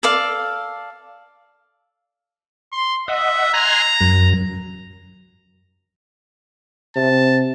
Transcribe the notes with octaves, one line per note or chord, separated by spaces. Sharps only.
A4 D5 F5
C6
D#5 E5 F#5
G#5 A#5 C6 F#6
F#2
C3 A5